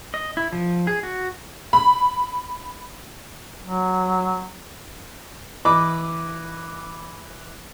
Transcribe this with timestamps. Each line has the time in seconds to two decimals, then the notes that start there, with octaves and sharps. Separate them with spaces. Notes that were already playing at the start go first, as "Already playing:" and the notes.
0.14 D#5
0.37 E4
0.53 F3
0.87 G#4
1.03 F#4
1.73 B5
3.62 F#3
5.65 E3 D#5 B5 D6